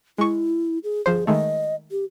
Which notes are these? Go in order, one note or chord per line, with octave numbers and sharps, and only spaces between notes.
G#3 E4 C#6
G#4
G1 F3 G#4 C5
D#3 G#3 A3 D#5
G4